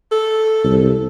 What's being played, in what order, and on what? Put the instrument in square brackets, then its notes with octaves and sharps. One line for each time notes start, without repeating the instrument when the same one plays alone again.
[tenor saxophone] A4
[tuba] C2